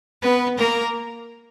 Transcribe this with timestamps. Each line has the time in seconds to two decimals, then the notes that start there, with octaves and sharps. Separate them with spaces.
0.21 B3 B4
0.57 A#3 A#4